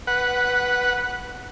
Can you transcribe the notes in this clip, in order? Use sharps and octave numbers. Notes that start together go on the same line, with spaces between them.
B4 F#5